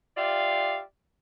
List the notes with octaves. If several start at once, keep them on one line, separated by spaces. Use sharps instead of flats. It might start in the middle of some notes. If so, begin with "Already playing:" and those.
F4 G4 D5 E5 F5